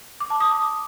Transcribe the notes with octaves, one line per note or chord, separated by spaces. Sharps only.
D6
A5
D#6
D6